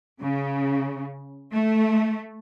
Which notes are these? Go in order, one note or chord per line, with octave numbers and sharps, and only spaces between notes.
C#3
A3